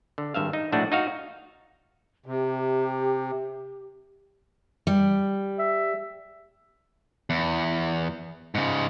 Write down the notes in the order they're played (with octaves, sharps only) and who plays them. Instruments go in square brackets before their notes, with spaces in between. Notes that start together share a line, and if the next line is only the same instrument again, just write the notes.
[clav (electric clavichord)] D3
G#1 G2 E5 F5
D#4
A#1 A2 A3 D4 F#4
D#4 F#4 F5
[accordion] C3 [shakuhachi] G4
[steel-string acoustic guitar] G3
[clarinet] E5
[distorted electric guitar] E2
G#2 C#3